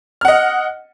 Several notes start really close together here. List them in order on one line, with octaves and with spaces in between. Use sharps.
F6 F#5 D#5